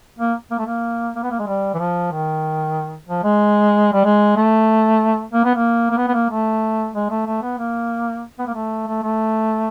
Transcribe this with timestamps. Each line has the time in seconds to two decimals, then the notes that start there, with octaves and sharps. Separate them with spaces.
0.19 A#3
0.51 A#3
0.58 A3
0.66 A#3
1.15 A#3
1.23 B3
1.31 A#3
1.39 G#3
1.47 G3
1.74 E3
1.79 F3
2.11 D#3
3.08 F3
3.23 G#3
3.93 G3
4.04 G#3
4.36 A3
5.33 A#3
5.44 B3
5.55 A#3
5.91 A#3
5.97 B3
6.08 B3
6.14 A#3
6.30 A3
6.94 G#3
7.10 A3
7.26 A3
7.42 B3
7.58 A#3
8.39 B3
8.46 A#3
8.54 A3
8.87 A3
9.03 A3